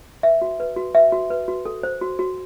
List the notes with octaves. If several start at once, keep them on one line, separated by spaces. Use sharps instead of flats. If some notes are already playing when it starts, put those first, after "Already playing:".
B4 E5
F#4
B4
F#4
B4 E5
F#4
B4
F#4
A4
C5
F#4
F#4